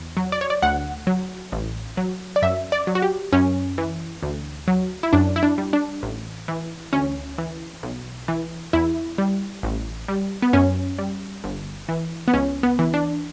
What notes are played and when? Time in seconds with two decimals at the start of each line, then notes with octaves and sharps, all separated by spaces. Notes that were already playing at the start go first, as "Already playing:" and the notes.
Already playing: E2
0.17 F#3
0.32 D5
0.41 C#5
0.50 D5
0.62 D2 F#5
1.07 F#3
1.52 A1
1.97 F#3
2.36 D5
2.42 F#2 E5
2.72 D5
2.87 F#3
2.95 F#4
3.02 G4
3.33 F#2 C#4
3.78 E3
4.23 D2
4.68 F#3
5.03 E4
5.13 F#2 D4
5.36 E4
5.43 D4
5.58 G3
5.73 D4
6.03 A1
6.48 E3
6.93 D2 C#4
7.38 E3
7.83 B1
8.28 E3
8.73 E2 E4
9.18 G3
9.63 A1
10.08 G3
10.42 B3
10.53 F#2 C#4
10.99 G3
11.44 G1
11.89 E3
12.28 B3
12.34 C#2 C#4
12.63 B3
12.79 E3
12.94 D4